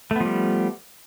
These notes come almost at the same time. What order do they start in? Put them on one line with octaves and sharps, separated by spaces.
A3 B3 F3 G3